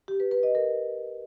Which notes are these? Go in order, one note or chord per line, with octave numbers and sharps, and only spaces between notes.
G4
B4
B4
D#5
A#4